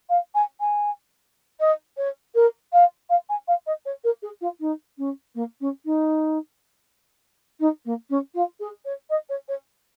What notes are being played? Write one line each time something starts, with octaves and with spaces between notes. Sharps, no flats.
F5
G#5
G#5
D#5
C#5
A#4
F5
F5
G#5
F5
D#5
C#5
A#4
G#4
F4
D#4
C#4
A#3
C#4
D#4
D#4
A#3
C#4
F4
G#4
C#5
D#5
C#5
C#5